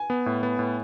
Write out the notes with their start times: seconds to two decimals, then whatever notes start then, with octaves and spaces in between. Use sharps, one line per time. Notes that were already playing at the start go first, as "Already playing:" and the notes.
Already playing: G#5
0.10 B3
0.26 A2
0.43 B3
0.59 A2